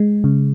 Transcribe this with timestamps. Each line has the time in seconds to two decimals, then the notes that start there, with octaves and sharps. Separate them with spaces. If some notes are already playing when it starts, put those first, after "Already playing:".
Already playing: G#3
0.24 C#3